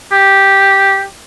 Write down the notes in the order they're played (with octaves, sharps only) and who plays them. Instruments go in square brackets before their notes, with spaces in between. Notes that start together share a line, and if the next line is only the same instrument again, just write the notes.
[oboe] G4